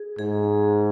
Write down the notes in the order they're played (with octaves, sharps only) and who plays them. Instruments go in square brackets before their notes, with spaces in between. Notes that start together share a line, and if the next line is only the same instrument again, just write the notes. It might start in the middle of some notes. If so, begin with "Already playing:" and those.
Already playing: [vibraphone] G#4
[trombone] G#2 [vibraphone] G#4